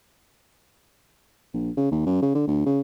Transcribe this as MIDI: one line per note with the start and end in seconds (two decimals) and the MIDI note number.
1.54 1.71 34
1.77 1.90 49
1.92 2.04 39
2.06 2.22 42
2.22 2.34 49
2.35 2.45 50
2.47 2.64 38
2.66 2.81 49